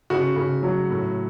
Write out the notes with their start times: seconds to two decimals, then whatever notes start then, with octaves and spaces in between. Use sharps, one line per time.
0.10 C#3 F#4
0.36 C#3
0.63 F#3
0.90 A2